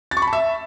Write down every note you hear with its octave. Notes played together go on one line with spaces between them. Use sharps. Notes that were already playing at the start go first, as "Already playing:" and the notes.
A6
C#6
B5
A5
E5